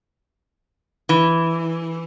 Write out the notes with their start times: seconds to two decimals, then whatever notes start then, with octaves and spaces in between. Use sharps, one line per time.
1.09 E3